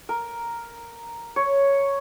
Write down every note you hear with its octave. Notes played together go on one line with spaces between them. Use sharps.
A#4
C#5